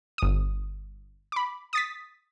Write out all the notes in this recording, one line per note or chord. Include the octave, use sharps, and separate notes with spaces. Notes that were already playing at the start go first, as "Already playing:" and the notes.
G1 D#6
B5 D6
D#6 A6 B6